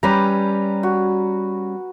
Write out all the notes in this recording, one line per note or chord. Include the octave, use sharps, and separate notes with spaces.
G3 C#4 G4 B4 A#5
F#4